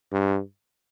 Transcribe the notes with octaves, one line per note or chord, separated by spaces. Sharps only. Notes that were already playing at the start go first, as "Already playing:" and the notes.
G2